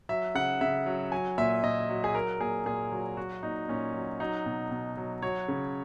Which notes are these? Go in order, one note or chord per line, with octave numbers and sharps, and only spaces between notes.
F#3 E5
C#3 F#5
C#3 E5
F#3
F#3 G#5
A#2 E5
A#2 D#5
F#3
G#4
F#3 A#4
A#2 G#4
A#2 G#4
F#3
F#3 F#4
A#2 D#4
A#2 C#4
F#3
F#3 D#4
B2
B2
F#3
F#3 C#5
C#3